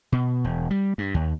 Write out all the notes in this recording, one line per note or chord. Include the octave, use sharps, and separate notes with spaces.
B2
E1
G3
G2
D#2